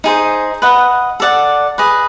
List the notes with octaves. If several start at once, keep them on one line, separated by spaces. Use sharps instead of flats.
D#4 G#4 C5
B4 D#5 F#5
A4 D5 F#5
G#4 B4 D#5